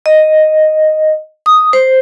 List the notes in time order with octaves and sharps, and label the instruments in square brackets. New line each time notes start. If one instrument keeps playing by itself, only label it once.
[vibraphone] D#5
D#6
C5